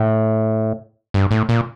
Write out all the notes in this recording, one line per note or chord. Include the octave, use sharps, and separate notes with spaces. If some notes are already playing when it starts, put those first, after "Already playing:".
Already playing: A2
G2
A2
A#2